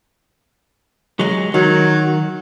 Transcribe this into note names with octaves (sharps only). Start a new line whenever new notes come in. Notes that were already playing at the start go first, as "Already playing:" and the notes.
F#3 G#3
D#3 F#3